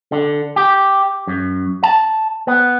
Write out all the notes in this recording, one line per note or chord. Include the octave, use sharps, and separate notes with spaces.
D3
G4
F#2
A5
B3